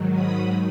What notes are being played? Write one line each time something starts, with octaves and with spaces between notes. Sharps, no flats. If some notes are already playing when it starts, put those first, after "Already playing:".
Already playing: G#2 D#3 F#3
B5 D#6